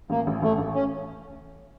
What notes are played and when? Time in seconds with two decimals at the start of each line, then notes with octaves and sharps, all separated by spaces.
0.10 A1 A#3
0.27 A1
0.43 A1 A3
0.58 A1
0.74 C#4